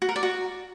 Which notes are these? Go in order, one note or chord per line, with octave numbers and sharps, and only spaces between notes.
F#4
A#4
D5
F#4